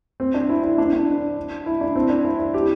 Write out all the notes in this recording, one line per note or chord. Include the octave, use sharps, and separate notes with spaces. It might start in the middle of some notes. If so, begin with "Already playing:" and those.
C4
D4
E4
E4
D4
D4
E4
D4
C4
D4
E4
E4
G4